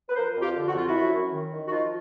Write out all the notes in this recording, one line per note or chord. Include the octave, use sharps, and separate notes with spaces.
B4
F3 A#4 C5
F2
F4 G4
D3
F#4
F2 F4
E4 F#4
F#2
F#2
D#3
D#3
F#4
F3 D#4 F4